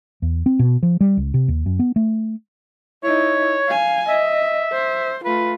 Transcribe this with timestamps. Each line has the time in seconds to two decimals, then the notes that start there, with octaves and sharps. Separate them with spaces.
0.22 E2
0.46 C4
0.59 B2
0.83 F3
1.01 G3
1.17 C#2
1.34 C3
1.48 D#2
1.66 F#2
1.79 B3
1.96 A3
3.04 D#4 E4 C#5
3.69 F5 G#5
4.09 D#5 E5
4.72 C5
5.25 A3 F4 B4